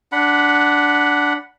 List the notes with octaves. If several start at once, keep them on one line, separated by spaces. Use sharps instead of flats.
D4 F#5 B5